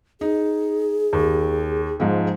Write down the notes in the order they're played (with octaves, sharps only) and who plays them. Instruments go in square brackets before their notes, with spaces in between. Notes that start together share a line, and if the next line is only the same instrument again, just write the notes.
[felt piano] D#4 [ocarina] G#4
[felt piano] D#2
G#2 F3 G#3